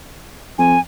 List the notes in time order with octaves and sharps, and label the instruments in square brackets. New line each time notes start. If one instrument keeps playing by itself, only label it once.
[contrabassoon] F2 [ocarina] G#5